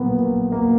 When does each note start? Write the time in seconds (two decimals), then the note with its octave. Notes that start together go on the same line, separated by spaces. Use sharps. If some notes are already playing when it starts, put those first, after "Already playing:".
Already playing: A#1 A#2 F#3 A#3 B3
0.52 A#3